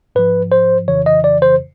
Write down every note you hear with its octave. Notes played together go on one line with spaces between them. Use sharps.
G#2 F3 B4
C5
F2 C#3 E3 C#5
D#5
D5
C5